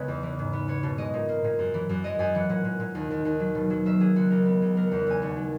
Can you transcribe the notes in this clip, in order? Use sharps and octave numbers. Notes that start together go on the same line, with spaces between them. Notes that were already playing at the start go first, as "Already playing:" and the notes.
Already playing: C#2 C#3 G#3 B3 B4 C#5
E2
E3
G#2
B3
B3 C#5
B2
G#3 D#5
A#2
A#3
A#2
F#2
E3
F#2
G#3 D#5
F#2 G#5
E3 F#5
A#2 F#5
A#2
A#2
D#2
D#2
D#2
F#3
B2
F#3
A#3 E5
F#3 G#4
C#2 F#4
C#2 A#4
B3
C#2
F#3 A#4
E2 F#5
F#5
E2 G#5
D#2 F#5
F#3